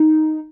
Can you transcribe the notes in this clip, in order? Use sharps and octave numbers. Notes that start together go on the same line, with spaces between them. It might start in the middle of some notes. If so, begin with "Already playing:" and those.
Already playing: D#4